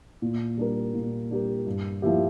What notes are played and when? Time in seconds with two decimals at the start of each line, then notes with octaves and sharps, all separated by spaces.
0.22 A#2
0.57 G3 D4 G4 A#4
0.94 A#2
1.31 G3 D4 G4 A#4
1.67 G2
2.02 F3 A#3 E4 G4